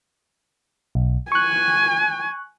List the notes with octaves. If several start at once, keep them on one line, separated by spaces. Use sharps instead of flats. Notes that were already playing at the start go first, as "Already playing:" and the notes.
B1
G#5 C#6 F#6